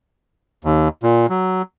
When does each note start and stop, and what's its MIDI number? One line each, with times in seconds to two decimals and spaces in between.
0.65 0.88 39
1.03 1.26 46
1.30 1.62 54